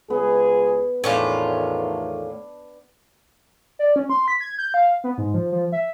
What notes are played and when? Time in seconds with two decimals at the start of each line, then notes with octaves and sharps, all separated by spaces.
0.10 C#2 B3 G#4
1.04 E2 A2 D#3 A3 C#4 D4 F4
3.79 D5
3.96 C#4
4.10 C6
4.28 B6
4.41 G#6
4.58 G6
4.74 F5
5.04 B3
5.18 G#2
5.34 F3
5.52 F3
5.72 E5